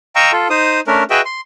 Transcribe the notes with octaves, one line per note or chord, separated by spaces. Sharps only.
D#5 F5 G5 A#5 C#6 E6
F4 A4
D#4 C5 D#6
A3 C#4 D4 A#4
F#4 G#4 B4 D#5 E5 G5
C6